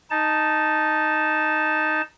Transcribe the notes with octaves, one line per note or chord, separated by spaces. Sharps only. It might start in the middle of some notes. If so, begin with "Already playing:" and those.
D#4 A5